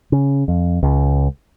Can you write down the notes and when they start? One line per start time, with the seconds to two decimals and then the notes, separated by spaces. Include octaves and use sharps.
0.12 C#3
0.48 F2
0.83 C#2